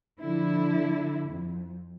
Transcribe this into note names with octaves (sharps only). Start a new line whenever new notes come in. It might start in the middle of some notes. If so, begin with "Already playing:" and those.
D3 F3 E4
F2